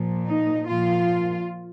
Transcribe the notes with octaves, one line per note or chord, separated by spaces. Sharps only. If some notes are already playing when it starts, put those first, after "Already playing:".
Already playing: A#2 F3
D#4
A#2 F3 F4